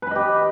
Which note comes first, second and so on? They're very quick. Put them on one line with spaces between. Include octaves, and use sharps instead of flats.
B4 B5 D#5 G4